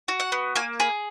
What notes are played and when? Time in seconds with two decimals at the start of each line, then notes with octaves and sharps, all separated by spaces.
0.08 F#4
0.20 F#5
0.32 B3
0.55 A#3 G#5
0.80 G#4 B5